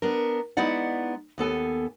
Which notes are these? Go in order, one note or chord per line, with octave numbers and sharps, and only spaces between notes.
B3 D4 A#4
G#3 B3 D#4 E4 D5 F#5
D#2 B3 A4 G#5